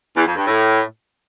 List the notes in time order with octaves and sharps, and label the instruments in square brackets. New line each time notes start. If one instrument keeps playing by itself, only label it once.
[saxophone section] E2
F2
G2
A2